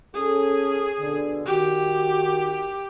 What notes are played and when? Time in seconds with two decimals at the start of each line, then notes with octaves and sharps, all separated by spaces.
0.15 C#4 G#4 A4
1.00 B2 D3
1.46 D#3 F#4 G4